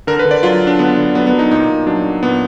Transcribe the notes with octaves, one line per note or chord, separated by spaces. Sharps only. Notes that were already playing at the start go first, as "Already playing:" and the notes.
D3 A#4
B4
D3
D5
F#3 F4
F#3
D4
D3 B3
D3
F#3 B3
B3
F#3
D#4
A#2 D#4
A#2
F#3 D4
F#3
A#2 B3